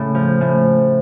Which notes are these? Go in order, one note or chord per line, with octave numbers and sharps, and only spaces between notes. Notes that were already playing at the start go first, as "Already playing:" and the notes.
Already playing: A2 C#3
F3
A2